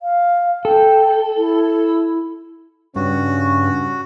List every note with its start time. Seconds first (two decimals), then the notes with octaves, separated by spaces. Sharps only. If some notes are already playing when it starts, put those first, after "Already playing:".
0.01 F5
0.65 A4 G5
1.37 E4
2.96 G2 C#3 C#4 F#4